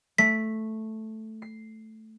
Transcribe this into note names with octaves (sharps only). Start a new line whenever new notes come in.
A3 B6
C7